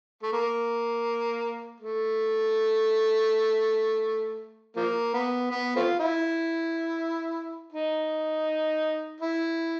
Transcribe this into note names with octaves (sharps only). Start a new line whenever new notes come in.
A3
A#3
A3
F3 A#3
B3
B3
A3 C4 F4
E4
D#4
E4